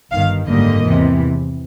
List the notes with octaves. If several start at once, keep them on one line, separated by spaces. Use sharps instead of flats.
G1 G2 D#3 F5
G#1 F#2 D3 G3 A#3 D#5
E2 C3 E3